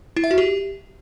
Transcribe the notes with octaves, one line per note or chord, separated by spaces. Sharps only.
E4
E5
F#4
G4